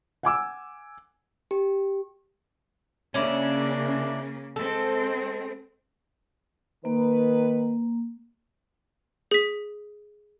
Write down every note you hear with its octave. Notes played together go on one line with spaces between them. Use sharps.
F#5 G#5 D6 E6
G4
C#3 A#3 C#4 D4 E4
G#3 C4 A4
D#3 A#3 B4
G#4 B6